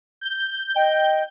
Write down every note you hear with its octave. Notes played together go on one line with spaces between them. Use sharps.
G6
D#5 G5